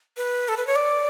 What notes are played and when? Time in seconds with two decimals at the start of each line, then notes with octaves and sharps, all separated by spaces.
0.17 B4
0.48 A4
0.57 B4
0.67 C#5
0.76 D5